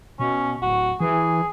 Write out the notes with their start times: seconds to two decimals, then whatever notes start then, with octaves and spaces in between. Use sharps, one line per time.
0.19 B2 C#4
0.62 D1 F#4
1.00 E3 G#4